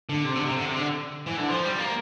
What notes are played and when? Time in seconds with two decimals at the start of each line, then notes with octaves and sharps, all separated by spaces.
0.09 D3
0.25 C3
0.36 D3
0.45 C3
0.56 D3
0.66 C3
0.76 D3
1.27 E3
1.38 D3
1.49 F3
1.64 G3
1.79 A#3